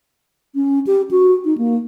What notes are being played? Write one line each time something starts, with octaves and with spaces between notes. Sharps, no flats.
C#4
G4
F#4
D#4
A#3